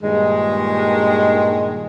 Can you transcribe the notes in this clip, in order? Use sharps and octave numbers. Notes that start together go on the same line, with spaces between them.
G2 A#2 D#3 G#3